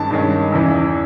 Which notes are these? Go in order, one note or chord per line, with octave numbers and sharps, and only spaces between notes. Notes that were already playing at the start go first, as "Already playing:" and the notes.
Already playing: G2 D#3 G#3 C#4 A5
G2 D#3 G#3 C#4
E2 C#3 E3